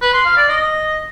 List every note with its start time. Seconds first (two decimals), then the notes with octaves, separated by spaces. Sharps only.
0.01 B4
0.13 C6
0.25 F5
0.37 D5
0.49 D#5